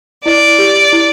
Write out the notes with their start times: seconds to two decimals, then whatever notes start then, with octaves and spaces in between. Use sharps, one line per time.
0.25 E4 D5
0.59 G4
0.92 E4